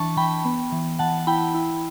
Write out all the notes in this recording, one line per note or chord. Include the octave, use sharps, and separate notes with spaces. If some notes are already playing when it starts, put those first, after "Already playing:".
Already playing: E3 D4 A5 C#6
E3 G5 B5
B3
E3
E3 F#5 A5
E4 G5 B5
E4